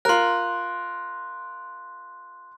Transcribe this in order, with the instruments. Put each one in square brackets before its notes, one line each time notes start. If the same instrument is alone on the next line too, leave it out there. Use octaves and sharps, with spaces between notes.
[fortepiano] F4 A#4 [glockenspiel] C6 F#6